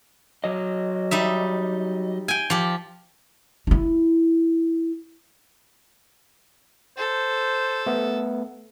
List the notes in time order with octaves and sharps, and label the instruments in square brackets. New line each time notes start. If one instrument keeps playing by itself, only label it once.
[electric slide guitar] F#3 D#5
[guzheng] G3 D#4 E5
G5 G#5
F3 G4
[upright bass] D#4 E4
[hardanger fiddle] A4 [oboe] C5
[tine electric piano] A3 B3